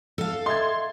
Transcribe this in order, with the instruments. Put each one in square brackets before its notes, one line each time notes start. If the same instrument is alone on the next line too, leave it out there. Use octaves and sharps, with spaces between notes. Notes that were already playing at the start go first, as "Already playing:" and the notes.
[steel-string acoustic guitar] A4 F5
[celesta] D#5 E5 A6 [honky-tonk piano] C6 G#6